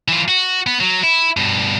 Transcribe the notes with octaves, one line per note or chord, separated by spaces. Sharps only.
E3 F4
F#4
B3
F#3
E4
G2 B2